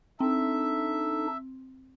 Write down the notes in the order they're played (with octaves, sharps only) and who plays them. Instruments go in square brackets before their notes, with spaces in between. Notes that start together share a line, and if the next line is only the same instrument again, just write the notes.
[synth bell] C4 [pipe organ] D4 D#4 A4 [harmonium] E5